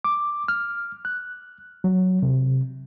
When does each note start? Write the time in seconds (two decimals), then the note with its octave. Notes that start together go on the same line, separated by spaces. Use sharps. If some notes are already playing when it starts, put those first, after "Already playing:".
0.04 D6
0.48 F6
1.05 F#6
1.84 F#3
2.22 C3